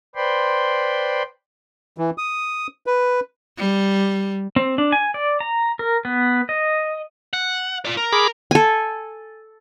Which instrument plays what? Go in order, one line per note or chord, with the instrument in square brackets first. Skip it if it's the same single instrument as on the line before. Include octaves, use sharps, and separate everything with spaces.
[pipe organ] B4 C5 D5 G5 B5 C6
[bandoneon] E3
D#6
B4
[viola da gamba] G3
[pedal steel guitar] C4
D4
G#5
D5
A#5
A#4
B3
D#5
[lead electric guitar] F#5
F4 D5
A#4
[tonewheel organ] G#4 B5 D6
[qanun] A4 G#5